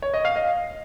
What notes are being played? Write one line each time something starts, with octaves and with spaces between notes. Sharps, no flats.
C#5
D#5
F5
D#5